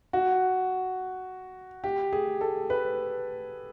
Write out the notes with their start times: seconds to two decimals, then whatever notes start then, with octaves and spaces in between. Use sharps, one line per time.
0.13 F#4
1.84 G4
2.13 G#4
2.41 A4
2.70 B4